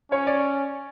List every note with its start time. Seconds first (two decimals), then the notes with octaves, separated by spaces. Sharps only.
0.11 C#4 C#5
0.27 D5